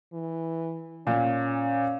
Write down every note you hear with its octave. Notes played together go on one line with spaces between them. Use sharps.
E3
A#2 C#4